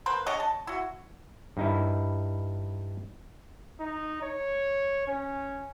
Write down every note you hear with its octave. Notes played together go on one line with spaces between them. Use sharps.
A#3 B4 C5
D4 G#4 C#5 D#5
A5
E4 F#4
G2 D#4 E4
D#4
C#5
C#4